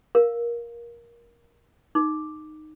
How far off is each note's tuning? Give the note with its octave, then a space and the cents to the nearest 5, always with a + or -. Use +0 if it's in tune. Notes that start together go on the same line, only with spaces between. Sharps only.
A#4 +15 F5 +0
D#4 -10 D6 +0